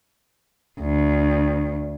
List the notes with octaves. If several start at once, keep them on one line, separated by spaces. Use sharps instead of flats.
D2